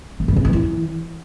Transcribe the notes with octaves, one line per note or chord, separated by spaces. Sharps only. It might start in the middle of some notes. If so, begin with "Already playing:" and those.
A3
G2
C#3
G2
E3